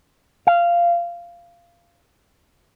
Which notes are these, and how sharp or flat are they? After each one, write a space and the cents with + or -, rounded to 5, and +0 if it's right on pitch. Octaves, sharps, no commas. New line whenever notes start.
F5 -15